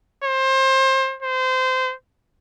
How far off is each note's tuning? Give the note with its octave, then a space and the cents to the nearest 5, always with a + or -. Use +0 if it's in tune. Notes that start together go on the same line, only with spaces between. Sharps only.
C5 +25
C5 -25